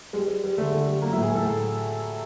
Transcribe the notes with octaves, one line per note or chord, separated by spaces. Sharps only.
G3 G#3
G3
G3
D3 A3
D3
G3
F#3 A#3
E4
A2
G#4
A2 A4
A2 A4